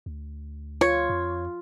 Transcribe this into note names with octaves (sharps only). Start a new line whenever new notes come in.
D2
F4 C#5
F2